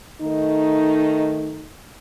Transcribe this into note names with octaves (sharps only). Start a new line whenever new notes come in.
D#3 A3 D#4